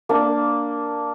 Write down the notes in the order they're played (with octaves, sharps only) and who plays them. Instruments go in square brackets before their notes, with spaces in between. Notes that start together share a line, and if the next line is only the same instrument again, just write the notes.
[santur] A#3 D4